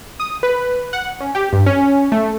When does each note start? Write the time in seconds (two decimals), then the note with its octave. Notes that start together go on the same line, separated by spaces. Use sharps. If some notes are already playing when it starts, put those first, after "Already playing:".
0.20 D#6
0.43 B4
0.93 F#5
1.20 C#4
1.35 G4
1.53 G2
1.66 C#4
2.12 A3